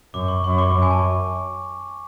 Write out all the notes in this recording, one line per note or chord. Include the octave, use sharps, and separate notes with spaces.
F#2 D6
C#6
F#2 C#6
D6
F#2
G#5
A5